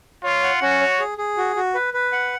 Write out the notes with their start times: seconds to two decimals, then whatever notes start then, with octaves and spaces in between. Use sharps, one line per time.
0.24 F4 C#5
0.43 F#5
0.62 C#4 F#4
0.81 C#5
0.99 G#4
1.18 G#4
1.37 F#4
1.56 F#4
1.75 B4
1.94 B4
2.12 F#5